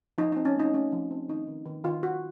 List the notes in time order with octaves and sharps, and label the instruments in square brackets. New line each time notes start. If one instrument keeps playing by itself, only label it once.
[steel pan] F3 D#4
C4 D#4
C#4
A3 D#4
A3 C#4
F3
C4
D#3 D#4
D#3
D#3
D#3 F4
D#3 F#4